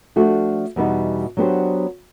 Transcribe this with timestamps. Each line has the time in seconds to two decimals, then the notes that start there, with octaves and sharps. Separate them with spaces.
0.16 F3 A3 D4 F#4
0.76 E2 B2 G3 B3 D#4
1.37 F#3 B3 D4 G4 C5